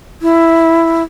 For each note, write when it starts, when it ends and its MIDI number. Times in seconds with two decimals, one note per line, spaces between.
0.22 1.03 64